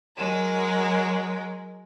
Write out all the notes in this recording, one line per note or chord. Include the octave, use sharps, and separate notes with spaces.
F#3 G#3 A#4